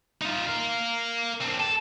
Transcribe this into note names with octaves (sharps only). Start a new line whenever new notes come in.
D#4 F4
A#4 F5
C4 D4
A4